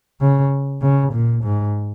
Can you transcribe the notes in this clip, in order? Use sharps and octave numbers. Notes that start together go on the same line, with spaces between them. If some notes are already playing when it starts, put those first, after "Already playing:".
C#3
C#3
A#2
G#2